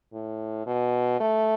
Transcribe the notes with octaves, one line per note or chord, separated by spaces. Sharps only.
A2
B2
A3